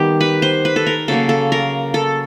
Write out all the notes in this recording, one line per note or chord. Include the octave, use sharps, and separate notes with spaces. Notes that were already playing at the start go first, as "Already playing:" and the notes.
Already playing: D#3 G3 B3 G4
B4
C5
B4
A4
A#4
C#3 F#3 A#3 A4
A4
A#4
A4